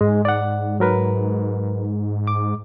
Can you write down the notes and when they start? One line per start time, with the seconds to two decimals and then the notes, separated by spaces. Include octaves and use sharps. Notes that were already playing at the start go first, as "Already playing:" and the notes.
0.01 G#2 G#3
0.25 D5 F#5
0.80 F#3 A#4 B4
2.27 D6